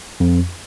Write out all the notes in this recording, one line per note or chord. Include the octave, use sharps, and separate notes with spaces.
F2